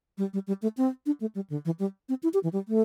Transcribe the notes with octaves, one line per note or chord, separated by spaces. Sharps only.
G3
G3
G3
A3
C4
D4
A3
G3
D3
E3
G3
C4
E4
G4
E3
G3
A3